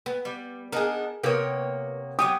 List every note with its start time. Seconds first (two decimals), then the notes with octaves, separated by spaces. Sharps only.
0.06 B3
0.25 G3
0.72 B3 D4 D#4 G#4 A#4
1.23 C3 A#3 B3 G4 A#4 B4 C#5
2.19 F#3 G#3 B3 G4 D#6